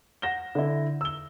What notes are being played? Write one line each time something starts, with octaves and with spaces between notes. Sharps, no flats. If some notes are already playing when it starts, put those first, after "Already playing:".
F#5 A#6 E7 G7
D3 E4
E6 G7